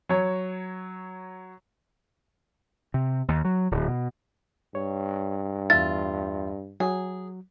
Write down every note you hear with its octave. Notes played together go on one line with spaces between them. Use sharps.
F#3 C#5
C3
D#2
F#3
D1
B2
G2 C#5
E2 F4 E5 A6
F#3 G#4